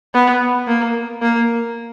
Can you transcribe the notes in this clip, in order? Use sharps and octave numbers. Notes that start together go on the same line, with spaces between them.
B3
A#3
A#3